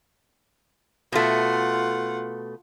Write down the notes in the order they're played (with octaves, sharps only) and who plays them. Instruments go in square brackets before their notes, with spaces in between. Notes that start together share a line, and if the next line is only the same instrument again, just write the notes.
[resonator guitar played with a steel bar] B2 A3 [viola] F4 F#5